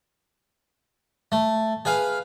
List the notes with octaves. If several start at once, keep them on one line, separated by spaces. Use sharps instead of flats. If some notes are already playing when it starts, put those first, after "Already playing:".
A3
G#4 B4 F5